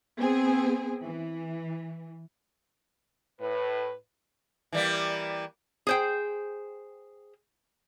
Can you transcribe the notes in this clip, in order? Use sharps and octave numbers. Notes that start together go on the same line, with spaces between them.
B3 C4 G#4
E3
A2 B4
E3 G3 A#3
G#4 C5 G5